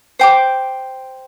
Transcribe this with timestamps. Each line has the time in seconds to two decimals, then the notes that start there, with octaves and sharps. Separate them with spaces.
0.19 C5 G5 D6